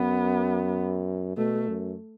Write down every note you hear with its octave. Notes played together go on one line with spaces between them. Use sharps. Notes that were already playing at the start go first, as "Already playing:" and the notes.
Already playing: F#2 B3
B2 A3
F#2